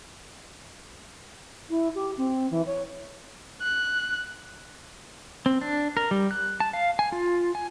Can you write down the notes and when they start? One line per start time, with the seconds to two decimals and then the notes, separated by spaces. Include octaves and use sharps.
1.70 E4
1.95 G4
2.18 C4
2.51 E3
2.66 C#5
3.62 F#6
5.46 C4
5.61 D4
5.97 A#4
6.11 G3
6.31 F#6
6.60 A5
6.73 F5
6.99 G#5
7.12 F4
7.55 G#5